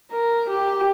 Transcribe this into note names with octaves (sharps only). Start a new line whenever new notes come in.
A#4
G4